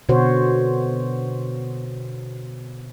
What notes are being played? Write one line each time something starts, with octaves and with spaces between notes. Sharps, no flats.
B2 D3 F#4 C5 C#5